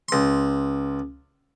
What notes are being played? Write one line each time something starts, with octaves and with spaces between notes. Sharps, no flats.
C#2 C6